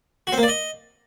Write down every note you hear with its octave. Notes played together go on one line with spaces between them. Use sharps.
F#4
C4
A#3
D5
D#5